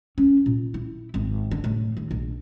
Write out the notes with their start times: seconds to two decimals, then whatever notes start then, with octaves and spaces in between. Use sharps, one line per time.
0.18 C#4
0.46 A#2
0.74 E4
1.14 G#1
1.51 D3
1.64 A2
1.97 D#2
2.11 A#1